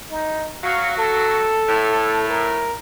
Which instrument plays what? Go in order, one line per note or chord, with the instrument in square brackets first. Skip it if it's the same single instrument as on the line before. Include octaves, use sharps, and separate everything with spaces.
[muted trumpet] D#4
[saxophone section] F#3 F#4 [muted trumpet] F5
[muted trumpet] A4
[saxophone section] A2
[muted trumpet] A#4